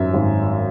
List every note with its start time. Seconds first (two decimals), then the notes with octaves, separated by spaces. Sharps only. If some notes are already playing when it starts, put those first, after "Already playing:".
Already playing: G#1 F#2 E5
0.13 G#1